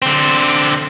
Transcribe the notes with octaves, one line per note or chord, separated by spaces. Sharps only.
D3 C4